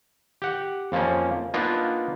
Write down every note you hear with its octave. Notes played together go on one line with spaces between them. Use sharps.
G4 F#5
F2 F3 A#3 C#4
A#3 B3 D4 D#4 F4